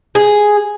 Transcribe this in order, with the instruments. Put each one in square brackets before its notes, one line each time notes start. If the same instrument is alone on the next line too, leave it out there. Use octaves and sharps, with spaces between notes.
[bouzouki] G#4